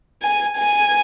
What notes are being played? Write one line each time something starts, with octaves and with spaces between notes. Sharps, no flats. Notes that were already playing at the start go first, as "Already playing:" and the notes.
G#5
G#5